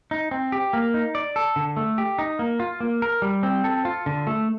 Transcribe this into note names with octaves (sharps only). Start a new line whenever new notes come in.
D#4
C4
G4
A#3
D#4
D5
A4
D3
A3
G4
D#4
A#3
F4
A#3
A#4
G3
C4
A4
F4
D3
A3